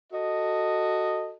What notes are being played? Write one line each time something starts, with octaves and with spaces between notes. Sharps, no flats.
F#4 A4 D#5